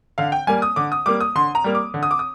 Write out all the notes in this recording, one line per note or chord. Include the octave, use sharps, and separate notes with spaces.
D3 F5
G5
G3 A#3 G#5
D#6
D3 D6
D#6
G3 A#3 D6
D#6
D3 C6
A#5
G3 A#3
D6
D3
D#6
D6
D#6